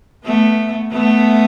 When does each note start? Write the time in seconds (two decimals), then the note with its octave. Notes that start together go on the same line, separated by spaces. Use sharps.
0.25 A3 B3
0.92 A3 B3